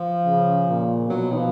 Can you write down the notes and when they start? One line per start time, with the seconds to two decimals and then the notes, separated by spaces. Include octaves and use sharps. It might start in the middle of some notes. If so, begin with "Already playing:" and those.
Already playing: F3
0.26 C#3
0.68 A#2
1.08 B2 F#3
1.32 D#3
1.36 F3